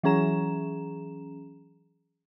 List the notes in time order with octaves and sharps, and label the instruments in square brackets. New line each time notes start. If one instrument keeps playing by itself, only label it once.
[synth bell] E3 F#3 C#4 G#4 A#5 E7